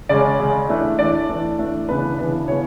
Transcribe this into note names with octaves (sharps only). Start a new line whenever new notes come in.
C#3 G#3 C#4 D5
C#3 G#3 C#4
E3 A3 D4
E3 A3 D4 D5
E3 A3 D4
E3 A3 D4
C#3 E3 B3 D4 B4
C#3 E3 B3 D4
C#3 E3 B3 C#5